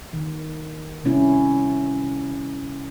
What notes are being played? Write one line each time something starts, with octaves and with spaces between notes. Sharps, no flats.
D#3
C3 G3 C#4 E4